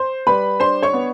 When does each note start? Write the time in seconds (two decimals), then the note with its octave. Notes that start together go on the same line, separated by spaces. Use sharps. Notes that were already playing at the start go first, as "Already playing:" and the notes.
Already playing: C5 C6
0.27 G3 B4 B5
0.60 D4 C5 C6
0.83 C#5 C#6
0.93 B3